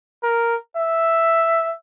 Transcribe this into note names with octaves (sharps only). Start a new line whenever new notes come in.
A#4
E5